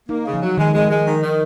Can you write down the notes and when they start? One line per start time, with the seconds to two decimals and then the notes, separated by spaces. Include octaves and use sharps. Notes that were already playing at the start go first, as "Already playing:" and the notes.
0.09 A#3 D#4
0.26 C#3
0.34 F3
0.43 F#3
0.58 D#3 G#3
0.74 G#3
0.90 G#3
1.07 D#3
1.23 D#3